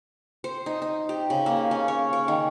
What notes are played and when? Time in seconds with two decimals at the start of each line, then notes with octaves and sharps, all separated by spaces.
0.44 C5
0.66 D#4
0.82 D#4
1.09 G4
1.30 C#3
1.46 A#3
1.71 C#4
1.88 C#5
2.13 C#5
2.28 D#3